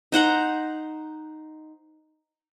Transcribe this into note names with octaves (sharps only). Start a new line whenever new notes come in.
D#4 C5 F#5 A#5